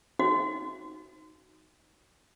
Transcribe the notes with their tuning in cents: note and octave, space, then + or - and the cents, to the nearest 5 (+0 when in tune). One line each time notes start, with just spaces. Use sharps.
D#4 +0 F#4 +0